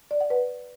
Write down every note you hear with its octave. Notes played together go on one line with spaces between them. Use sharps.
D5
F#5
B4